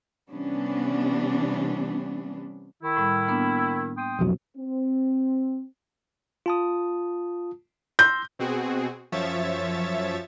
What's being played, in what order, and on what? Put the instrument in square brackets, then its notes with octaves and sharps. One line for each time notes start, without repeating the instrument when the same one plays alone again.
[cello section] C3 E3 G3 B3 C#4 D4
[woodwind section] D#3 E4
[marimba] A2 G3
A#3 B3 D4
[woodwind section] G5 C6 D#6
[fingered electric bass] B1 F2 F#3 [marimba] C3
[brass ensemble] C4
[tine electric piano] F4 A5 D#6
[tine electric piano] C6 E6 A#6 [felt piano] G6
[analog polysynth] B2 C4 F#4 G#4
F#2 F3 C#5 E5 A6